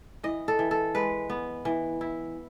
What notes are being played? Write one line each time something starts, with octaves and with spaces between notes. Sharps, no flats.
E3 D#5
A4
E3
A4
G#3 B4
B3
E3
E4